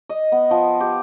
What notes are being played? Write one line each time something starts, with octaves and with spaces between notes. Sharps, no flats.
D#5
B3
F3
G4